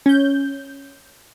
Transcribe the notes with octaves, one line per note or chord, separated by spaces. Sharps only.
C#4 G6